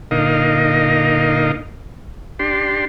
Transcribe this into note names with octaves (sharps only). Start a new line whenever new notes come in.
A#2 D3 D#4 A#4 D#5 F5
D4 G4 C6